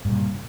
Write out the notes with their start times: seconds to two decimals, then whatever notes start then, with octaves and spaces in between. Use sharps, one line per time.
0.05 G2
0.08 A#2
0.11 C#3